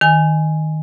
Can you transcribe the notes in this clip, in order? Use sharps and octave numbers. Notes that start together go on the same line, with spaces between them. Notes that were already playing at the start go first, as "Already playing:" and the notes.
D#3 G#5